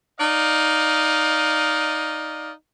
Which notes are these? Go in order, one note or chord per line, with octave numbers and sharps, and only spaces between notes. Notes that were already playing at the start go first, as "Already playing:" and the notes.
D#4 D5 D#5 F5